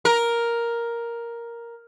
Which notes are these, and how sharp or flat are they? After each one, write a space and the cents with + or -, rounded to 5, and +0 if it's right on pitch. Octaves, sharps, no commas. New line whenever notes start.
A#4 +5